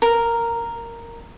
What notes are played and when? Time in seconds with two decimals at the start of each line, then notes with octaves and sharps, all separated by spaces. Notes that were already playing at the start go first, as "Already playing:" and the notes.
0.02 A#4